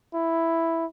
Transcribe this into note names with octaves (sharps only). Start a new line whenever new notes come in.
E4